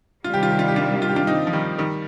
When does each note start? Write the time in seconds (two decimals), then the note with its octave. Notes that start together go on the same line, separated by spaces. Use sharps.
0.24 C3 D#3 G3 F4
0.34 G4
0.43 F4
0.51 G4
0.59 F4
0.68 G4
0.76 D4 F4
1.02 F4
1.09 G4
1.16 D4 F4
1.27 C4 D#4
1.47 F3
1.53 D#3 G3
1.78 D#3 G3